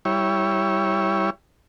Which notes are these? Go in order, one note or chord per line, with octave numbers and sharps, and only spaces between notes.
G3 E4 C#5